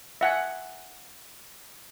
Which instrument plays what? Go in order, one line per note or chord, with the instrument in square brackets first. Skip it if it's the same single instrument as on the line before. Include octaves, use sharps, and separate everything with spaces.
[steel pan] E5 F#5 G#5